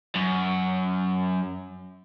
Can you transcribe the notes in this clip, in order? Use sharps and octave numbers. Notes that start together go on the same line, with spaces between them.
F#2